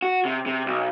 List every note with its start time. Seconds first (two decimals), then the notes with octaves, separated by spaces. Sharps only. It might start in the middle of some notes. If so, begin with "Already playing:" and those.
0.02 F#4
0.25 C3
0.46 C3
0.66 B1